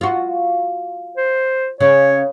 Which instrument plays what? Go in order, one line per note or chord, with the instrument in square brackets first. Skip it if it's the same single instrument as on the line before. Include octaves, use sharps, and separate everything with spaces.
[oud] F4 F#4
[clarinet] C5
[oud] C#3 [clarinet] C#5